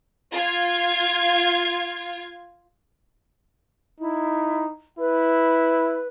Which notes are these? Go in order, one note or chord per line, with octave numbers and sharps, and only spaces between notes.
F4 G#6
D#4 E4
E4 B4